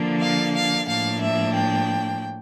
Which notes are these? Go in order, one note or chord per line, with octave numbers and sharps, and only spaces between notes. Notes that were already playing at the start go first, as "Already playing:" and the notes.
Already playing: D3 F3 A#3 D4
F5
F5
A2 F3 A#3 D4 F5
E5
G5